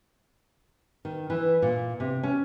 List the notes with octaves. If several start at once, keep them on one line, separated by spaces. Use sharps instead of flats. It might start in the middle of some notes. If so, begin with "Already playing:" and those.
D#3
E3
A#2
C3
C#4